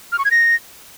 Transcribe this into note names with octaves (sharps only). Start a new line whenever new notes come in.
F6
C#6
G#6
A#6